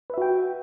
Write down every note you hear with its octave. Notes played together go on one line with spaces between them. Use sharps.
F#4 B4 E5 G5